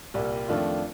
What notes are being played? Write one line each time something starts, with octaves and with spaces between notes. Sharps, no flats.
C2 A#2 G3 A#3
F2 D#3 A3 D4 F4